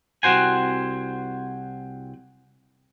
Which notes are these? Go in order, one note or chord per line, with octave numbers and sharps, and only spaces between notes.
C2 C4 F#4 C5 G#5